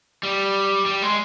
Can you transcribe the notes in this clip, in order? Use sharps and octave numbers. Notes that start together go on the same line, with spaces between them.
G3
G3
G#3